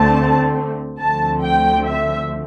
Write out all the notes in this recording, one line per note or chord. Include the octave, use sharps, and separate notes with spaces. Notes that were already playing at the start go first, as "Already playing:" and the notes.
Already playing: D2 D3 A3 C4 A5
D2 D3 F3 A3 C4 A5
G5
E5